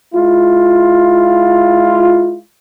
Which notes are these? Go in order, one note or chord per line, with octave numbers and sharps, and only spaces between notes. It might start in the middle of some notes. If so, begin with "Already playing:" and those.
G#3 E4 F4